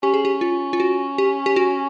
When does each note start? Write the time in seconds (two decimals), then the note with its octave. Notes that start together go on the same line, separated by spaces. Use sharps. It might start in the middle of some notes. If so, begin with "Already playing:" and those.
0.03 C#4 G4
0.14 G#4
0.25 G4
0.41 F4
0.73 F4
0.80 F#4
1.18 G4
1.46 G4
1.56 F#4